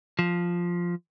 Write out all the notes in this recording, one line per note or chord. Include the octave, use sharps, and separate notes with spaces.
F3